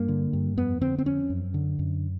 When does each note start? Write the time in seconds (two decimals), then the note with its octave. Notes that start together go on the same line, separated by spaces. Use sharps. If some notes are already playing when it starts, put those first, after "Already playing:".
Already playing: G2 A#3
0.08 D3
0.33 G2
0.57 F2 B3
0.81 D3 C4
0.98 C4
1.05 F2 C#4
1.30 F#2
1.54 D3
1.79 F#2